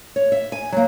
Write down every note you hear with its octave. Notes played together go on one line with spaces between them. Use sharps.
C#5
E5
G#5
F#3 A#3